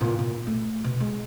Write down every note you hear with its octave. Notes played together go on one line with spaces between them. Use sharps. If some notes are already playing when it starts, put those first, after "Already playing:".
A#2 B3
A#2
A3
B2
G#3